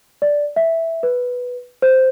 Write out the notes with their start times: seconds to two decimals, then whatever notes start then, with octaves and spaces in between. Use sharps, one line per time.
0.22 D5
0.56 E5
1.03 B4
1.82 C5